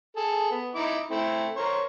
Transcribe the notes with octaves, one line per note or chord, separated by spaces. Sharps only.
G#4 A4
B3
D#4 E4 D6
A3 C4 E4
A#4 C5 C#5